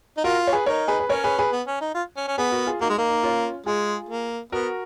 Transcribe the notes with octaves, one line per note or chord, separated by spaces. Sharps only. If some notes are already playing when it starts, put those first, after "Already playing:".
D#4
F4 F#4 A#4
C#5
G#4 B4
D#4 A#4 C#5
G#4 B4
B4
C#4 A#4 C#5
G#4 B4
G#4 B4
B3
C#4
D#4
F4
C#4
C#4
B3 G#4 B4
F#4 A#4
F4 G#4
A#3 D#4 F#4
G#3
A#3 D#4
D#4
C#4 F4
G#3 F4 G#4
A#3
B3 F#4 A#4